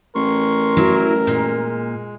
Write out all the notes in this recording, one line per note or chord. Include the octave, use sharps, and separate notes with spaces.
A1 A#4 C6 C#6
F#3 E4
A#2 G#3